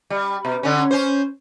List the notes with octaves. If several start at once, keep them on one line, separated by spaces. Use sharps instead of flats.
G3
B2
D3 C#4
C#4 C5